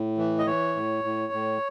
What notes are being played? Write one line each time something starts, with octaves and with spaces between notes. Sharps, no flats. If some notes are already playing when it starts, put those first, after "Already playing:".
Already playing: A2
E3
D#5
E3 C#5
A2
A2
A2